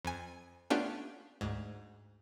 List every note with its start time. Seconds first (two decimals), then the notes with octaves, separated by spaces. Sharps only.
0.05 F2 G#5
0.70 A3 B3 C#4 D4 F4 G4
1.41 D2 G#2